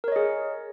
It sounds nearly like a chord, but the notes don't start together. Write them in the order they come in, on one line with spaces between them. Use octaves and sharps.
A#4 C#5 D#5 G#4